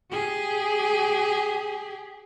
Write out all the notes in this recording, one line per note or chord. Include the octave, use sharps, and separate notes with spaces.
G4 G#4